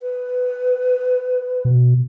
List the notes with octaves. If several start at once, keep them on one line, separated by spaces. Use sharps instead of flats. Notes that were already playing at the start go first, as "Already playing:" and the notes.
B4
B2